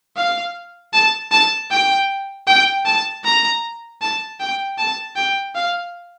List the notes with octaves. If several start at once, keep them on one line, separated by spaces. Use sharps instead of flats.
F5
A5
A5
G5
G5
A5
A#5
A5
G5
A5
G5
F5